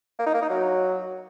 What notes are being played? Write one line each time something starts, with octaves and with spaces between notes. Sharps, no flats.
A#3
D#4
A#3
D#4
F#3